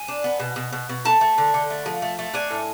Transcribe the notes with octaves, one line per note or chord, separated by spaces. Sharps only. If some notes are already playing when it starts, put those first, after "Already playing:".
Already playing: G#5
D4
B3
B2
B2
B2
B2
A3 A5
A3
D3
D3
A3
F3
A3
A3
D4 G#5
A2